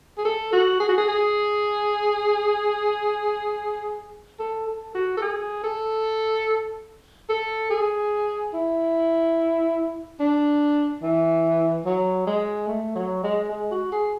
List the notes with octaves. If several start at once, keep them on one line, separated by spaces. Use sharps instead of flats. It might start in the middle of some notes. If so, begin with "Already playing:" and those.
G#4
A4
F#4
G#4
F#4
G#4
G#4
A4
A4
F#4
A4
G#4
A4
A4
G#4
E4
D4
E3
F#3
G#3
A3
F#3
G#3
G#3
F#4
G#4